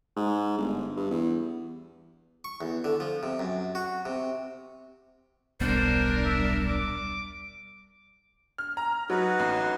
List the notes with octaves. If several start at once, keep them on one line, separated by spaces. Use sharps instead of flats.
G#2
G1
G2
E2
C#6
E2
D3
F3
C3
F#2
F#4
C3
D#1 B1 G3 B3 D4 A#4 C5
E5
D6
F6
A#5
F#3 D#4 F#4 B4
A1